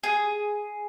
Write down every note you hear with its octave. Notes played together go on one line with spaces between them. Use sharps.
G#4